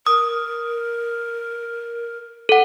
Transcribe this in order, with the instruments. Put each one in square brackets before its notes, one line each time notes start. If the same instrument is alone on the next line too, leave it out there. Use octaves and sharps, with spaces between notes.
[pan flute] A#4 [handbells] D#6
[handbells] A4 F#5